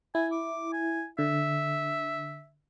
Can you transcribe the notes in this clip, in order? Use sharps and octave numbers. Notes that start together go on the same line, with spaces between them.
E4 G#5
D6
G#5
D3 E5